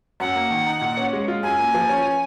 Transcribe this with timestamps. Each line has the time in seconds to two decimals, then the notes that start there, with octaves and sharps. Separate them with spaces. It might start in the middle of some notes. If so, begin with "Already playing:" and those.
0.20 F#2 F#5
0.36 A#3
0.51 D#3
0.67 D#4
0.81 A#2
0.97 C#4
1.13 G#3
1.28 F4
1.43 F#2 G#5
1.58 A#3
1.74 F3
1.89 C#4